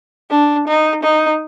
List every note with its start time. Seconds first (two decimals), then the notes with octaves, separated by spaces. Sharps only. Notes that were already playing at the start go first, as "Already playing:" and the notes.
0.31 D4
0.67 D#4
1.03 D#4